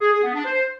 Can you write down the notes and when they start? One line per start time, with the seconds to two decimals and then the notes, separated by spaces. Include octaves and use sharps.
0.01 G#4
0.12 G#4
0.23 B3
0.34 D4
0.45 C5